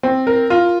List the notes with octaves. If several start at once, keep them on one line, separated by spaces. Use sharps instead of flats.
C4
A#4
F4